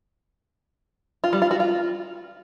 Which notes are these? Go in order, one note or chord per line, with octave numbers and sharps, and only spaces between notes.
F4
G3
F4
F#4
F4